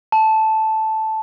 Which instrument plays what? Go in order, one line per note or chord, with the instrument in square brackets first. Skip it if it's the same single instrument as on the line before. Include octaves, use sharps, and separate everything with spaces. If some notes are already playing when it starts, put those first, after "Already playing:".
[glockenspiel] A5